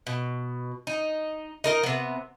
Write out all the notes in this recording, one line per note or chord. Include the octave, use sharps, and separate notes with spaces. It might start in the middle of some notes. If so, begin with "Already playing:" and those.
B2
D#4
D#4 A#4 D#5
C3 B3